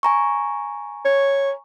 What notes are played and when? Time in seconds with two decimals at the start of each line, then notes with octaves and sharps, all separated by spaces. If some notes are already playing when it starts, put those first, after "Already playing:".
0.03 G#5 A#5 C#6
1.05 C#5